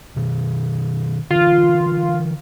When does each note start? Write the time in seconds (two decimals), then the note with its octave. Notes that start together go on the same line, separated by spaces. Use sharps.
0.16 B2 D#3
1.31 D3 E3 F4